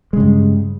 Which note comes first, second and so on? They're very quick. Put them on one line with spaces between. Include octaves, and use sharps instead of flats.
G#3 C#3 G2